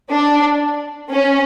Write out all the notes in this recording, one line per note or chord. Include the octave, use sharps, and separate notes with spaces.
D4
C#4